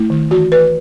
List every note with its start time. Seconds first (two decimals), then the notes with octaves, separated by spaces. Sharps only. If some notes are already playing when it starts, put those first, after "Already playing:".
Already playing: A3 E4
0.10 D#3
0.31 E3 F#4
0.52 E3 B4